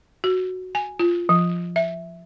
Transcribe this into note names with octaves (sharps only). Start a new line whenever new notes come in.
F#4
G#5
F4
F3
E5